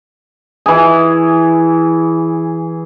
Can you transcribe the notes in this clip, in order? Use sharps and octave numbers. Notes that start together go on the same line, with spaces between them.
E3 G#4